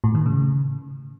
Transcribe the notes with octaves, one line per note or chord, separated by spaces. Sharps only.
A2
D#3
C#3